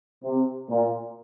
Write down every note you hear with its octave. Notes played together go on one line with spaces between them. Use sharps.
C3
A#2